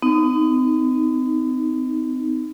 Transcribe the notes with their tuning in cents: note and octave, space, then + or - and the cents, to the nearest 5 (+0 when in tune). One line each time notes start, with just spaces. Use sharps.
B3 +45 D#4 +0